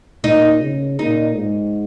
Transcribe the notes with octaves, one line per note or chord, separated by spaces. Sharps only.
A#2 D#4
C#3
A#2 D#4
G#2